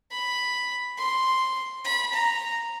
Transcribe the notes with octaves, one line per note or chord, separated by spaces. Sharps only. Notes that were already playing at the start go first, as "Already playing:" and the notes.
B5
C6
B5
A#5